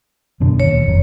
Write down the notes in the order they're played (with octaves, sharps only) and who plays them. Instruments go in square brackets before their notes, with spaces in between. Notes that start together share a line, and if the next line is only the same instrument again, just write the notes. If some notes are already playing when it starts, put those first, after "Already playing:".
[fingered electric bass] F#2 B2 D3
[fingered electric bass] D#1 D#2 [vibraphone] C#5
[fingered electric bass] G1 F2